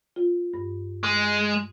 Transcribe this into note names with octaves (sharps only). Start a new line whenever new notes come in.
F4
G2
G#3